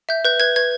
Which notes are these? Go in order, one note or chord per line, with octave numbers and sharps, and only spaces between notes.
E5 G6
B4 G6
B4 G#6
B4 G#6